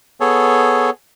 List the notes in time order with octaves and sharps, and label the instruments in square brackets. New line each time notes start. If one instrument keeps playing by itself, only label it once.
[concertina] B3 G#4 A4 C#5